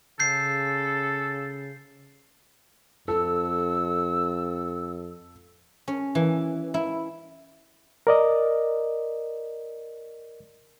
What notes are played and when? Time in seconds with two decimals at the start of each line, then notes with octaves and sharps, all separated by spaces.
0.20 C#3 A4 G6 C7
3.08 F2 A4 E6
5.88 C#4
6.15 E3
6.74 E4
8.07 A#4 D5 D#5